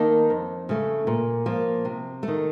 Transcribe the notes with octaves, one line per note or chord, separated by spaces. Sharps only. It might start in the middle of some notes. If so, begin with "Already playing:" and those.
Already playing: D#3 A#3 D#4 A5
F2
C#3 A3
A#2
F3 A#3
C3
A3
D#3